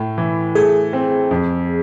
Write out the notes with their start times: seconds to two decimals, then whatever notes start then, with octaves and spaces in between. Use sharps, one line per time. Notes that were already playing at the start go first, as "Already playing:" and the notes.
Already playing: A2
0.18 E3
0.55 A3 G#4
0.93 C4
1.31 F2